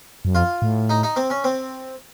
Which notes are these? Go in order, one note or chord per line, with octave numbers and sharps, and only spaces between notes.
F#2
F2 F4
A2
D#4
D#4
C4
C#4
C4